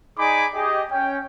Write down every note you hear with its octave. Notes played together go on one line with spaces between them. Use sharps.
D#4 G#4 D5 G#5 B5 D6
G4 G#4 D#5
C#4 G5